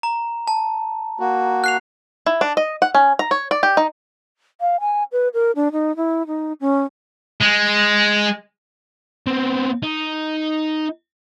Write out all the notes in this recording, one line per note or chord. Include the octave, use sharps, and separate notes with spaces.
A#5
A5
A#3 F#4
F#6 C7 F7
E4
D4
D#5
F#5
C#4
A#5
C#5
D5
G4
D#4
F5
G#5
B4
A#4
D4
D#4
E4
D#4
C#4
G#3
B3 C4
D#4